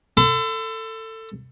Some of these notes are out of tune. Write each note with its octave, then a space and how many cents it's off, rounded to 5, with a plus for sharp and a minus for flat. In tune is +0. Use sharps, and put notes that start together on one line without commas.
A4 +20 C6 -45